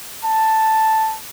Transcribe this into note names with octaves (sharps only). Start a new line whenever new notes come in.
A5